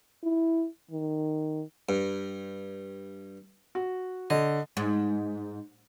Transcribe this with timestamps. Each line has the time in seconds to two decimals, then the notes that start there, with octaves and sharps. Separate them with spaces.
0.23 E4
0.91 D#3
1.89 G2
3.75 F#4
4.30 D3 D#5
4.77 G#2